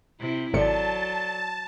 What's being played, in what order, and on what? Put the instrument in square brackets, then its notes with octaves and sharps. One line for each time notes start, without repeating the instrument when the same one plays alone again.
[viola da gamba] C3 E4
[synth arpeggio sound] G#1 C3 C#7 [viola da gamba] F#3 [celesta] A4 D5 [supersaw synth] A5